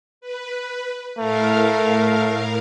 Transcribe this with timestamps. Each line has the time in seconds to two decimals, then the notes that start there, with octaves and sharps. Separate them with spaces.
0.21 B4
1.18 A2 A3 A#4 F5